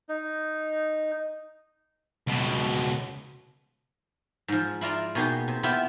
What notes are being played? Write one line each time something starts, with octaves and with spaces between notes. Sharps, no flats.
D#4
C#2 B2
G#2 F3
E4 F4 D5 A#5
B2 A#3 D#4 G4 G#4
C3
C3 B3 E4 F4 G4